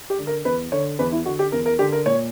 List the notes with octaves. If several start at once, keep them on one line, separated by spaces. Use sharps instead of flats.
G4
D3
A#4
E2 B4
D3 C#5
E2 B4
E4
D3 F#4
G4
E2 A#4
A#4
D3 G4
A#4
A#2 C#5